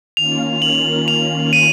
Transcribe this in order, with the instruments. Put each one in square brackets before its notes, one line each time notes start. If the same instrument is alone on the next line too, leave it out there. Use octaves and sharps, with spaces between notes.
[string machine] D#3 A#3 C#4 F4 [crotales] F7
[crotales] F#7
F7
D#7